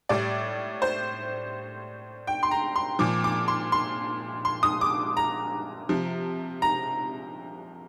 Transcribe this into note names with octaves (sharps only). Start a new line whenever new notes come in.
A2 G3 D5
C5
G5
C6
A#5
C6
A#2 F3 D6
D6
C6
C6
C6
D#6
D6
A#5
C3 F3
A#5